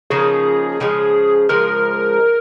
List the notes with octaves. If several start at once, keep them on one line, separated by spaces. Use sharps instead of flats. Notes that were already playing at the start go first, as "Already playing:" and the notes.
C#3 F3 A#3 D#4 G#4
C#3 F3 G#3
C#3 F3 G#3 A#4